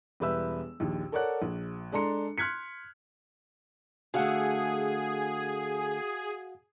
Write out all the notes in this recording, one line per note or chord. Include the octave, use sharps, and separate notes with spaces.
E1 G3 G4 B4 E5 E6
A#1 D#2
A4 A#4 C#5 D5 F#5 F#6
A#1
G#3 D4 A4 A#5 C6 C#7
C6 F6 F#6 G#6 B6 C#7
D3 A3 F#4 G#4 F5 F#5